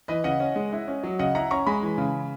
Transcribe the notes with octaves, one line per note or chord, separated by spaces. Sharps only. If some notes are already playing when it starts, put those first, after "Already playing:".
E3 B4 D#5
C#3 D#5 F#5
C#4
G#3
E4
C#4
F#3
C#3 D#5 F#5
E4 F#5 A#5
C#4 A#5 C#6
G#3 G#5 B5
E3
C#3